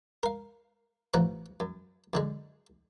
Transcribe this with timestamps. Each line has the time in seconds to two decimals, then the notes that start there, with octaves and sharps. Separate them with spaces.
0.23 A#4 F5
1.14 A1 G2 F3 F#5 A#5
1.60 F#2
2.13 F#2 D3 G#3